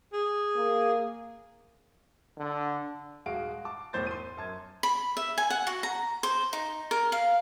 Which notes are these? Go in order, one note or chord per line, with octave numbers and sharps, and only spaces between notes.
G#4
A#3
D3
D#1 G#3 F#4 F5 D7
A5 D6
E1 E2 A2 C5 G6 A6
C6 D#7
F#2 A5 G#6
B5
E5
G#5
F#5
F#4
A#5
C5
D#4
A#4
F5